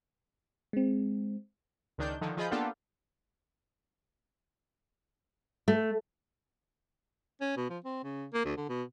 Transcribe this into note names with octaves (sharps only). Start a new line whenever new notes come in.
G#3 C4
C#2 D#3 D4 G6
D3 D#3 F3
F3 F4 G#4 D#5 B5 G6
A#3 B3 D4 F4 G4 A4
A3
C#4
B2
F3
C4
C#3
A#3
D2
D3
B2